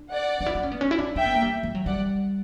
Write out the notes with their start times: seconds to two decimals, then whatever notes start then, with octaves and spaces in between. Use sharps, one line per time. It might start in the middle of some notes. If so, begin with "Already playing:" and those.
Already playing: D4
0.10 D5 F#5
0.41 D4
0.46 E4
0.55 D4
0.63 C#4
0.72 B3
0.81 C#4
0.91 E4
0.99 D4
1.16 D4 E5 G5
1.25 B3
1.33 A#3
1.42 G3
1.63 G3
1.75 F#3
1.86 G3 D5 F#5